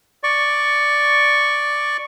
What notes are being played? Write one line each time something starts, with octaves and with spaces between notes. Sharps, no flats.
D5 C#6